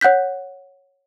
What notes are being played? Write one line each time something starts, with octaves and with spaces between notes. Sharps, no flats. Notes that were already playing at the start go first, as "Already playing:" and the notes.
C#5 F#5 F#6 G6 B6